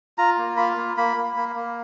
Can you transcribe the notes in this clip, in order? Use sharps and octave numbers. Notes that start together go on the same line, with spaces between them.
F4 A#5
A#3
F4 B5
A#3
A#3 B5
A#3
A#3
A#3